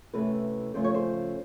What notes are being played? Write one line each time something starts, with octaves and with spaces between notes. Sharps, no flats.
C3 E3 A3 C#4 B4
C#3 F3 A3 C#4 C5
C#5
C5